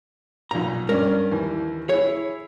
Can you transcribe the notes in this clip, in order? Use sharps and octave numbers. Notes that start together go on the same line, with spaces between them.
B1 A#2 A#5
G2 C#4 A#4 D5
D#2 E3
E4 G#4 C#5